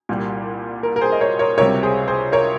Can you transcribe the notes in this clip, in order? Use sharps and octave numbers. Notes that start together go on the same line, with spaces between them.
C2 A#2 G3
A#4
A#4
G#4 C5
D#5
A#4 C#5
A#4 C#5
C#2 C3 G3 A#4 C#5
G#4 C5
G#4 C5
A#4 C#5